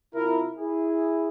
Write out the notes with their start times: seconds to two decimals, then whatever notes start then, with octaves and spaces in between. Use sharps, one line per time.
0.15 C3 E4 F4 A#4
0.57 E4 G#4